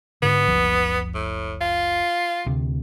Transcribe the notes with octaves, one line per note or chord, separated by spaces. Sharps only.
G#2 D3 B3
F#1 C#2 F3
A2
F4
D2 C3